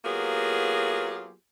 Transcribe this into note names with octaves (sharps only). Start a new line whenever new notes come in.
F#3 A#3 B3 F4 G4 G#4